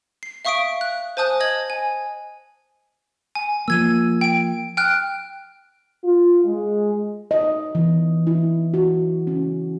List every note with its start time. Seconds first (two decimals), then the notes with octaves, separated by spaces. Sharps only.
0.23 C7
0.45 E5 F5 C#6 D#6 B6 D7
0.81 F#6
1.17 C5 G#5 A5 D#6 F#6 G6
1.40 D#5 D#6 G#6 F#7
1.70 G#5
3.35 G#5
3.68 F3 A#3 E6 G#6 D#7
4.21 G5 D7
4.77 G5 F6 F#6
6.04 F4
6.45 G#3
7.31 D#5
7.75 E3
8.27 E4
8.74 F#4
9.27 C#4